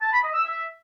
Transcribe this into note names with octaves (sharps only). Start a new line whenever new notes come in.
A5
B5
D#5
E6
E5